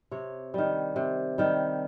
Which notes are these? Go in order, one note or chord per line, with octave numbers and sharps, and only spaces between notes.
C3 C#5
D#3 G3
C3
D#3 G3